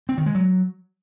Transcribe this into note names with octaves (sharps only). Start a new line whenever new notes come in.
C4
D#3
G#3
F#3